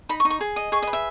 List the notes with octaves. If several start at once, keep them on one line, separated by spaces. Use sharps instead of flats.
D#4 B5
C#6
D#4
C#6
G#4
D#5
G#4 C#6
D#5
B4
E5